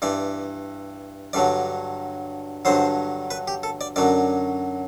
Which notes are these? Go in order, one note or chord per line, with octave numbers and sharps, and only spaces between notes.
G2 E3 D5
G2 D3 F#3 D5
G2 D3 F#3 C5
B4
G4
A4
D5
F#2 D3 F#3 D5